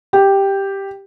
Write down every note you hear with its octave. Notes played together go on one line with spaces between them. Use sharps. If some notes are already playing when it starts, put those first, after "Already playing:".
G4